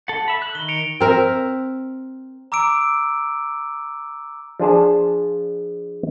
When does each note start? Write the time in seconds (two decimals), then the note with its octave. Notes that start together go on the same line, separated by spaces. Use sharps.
0.08 A4 F#5
0.28 E5 B5
0.42 F#6
0.55 D#3 G7
0.68 C#7 D7 F7
1.00 C4 A#4 E5
2.52 A#5 D6 E6 D7
4.60 F3 D4 G#4 A5